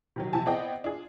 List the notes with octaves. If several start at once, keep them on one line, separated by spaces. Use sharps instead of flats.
C3 D#3 F#3
C3 F3 E4 G#5 A5
B3 C4 G#4 D5 D#5 G5
D4 F4 G#4